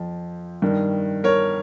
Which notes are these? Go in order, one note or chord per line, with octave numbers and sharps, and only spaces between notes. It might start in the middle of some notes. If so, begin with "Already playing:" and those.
Already playing: F2 F3
G2 D#3
A#4 C#5